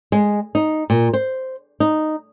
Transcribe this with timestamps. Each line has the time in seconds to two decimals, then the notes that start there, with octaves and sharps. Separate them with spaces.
0.12 G#3
0.55 D#4
0.90 A#2
1.13 C5
1.80 D#4